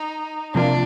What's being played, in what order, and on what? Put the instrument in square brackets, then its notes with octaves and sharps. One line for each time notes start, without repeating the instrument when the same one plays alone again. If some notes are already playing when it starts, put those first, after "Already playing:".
Already playing: [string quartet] D#4
[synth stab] C3 F3 A#3 F4 [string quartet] D4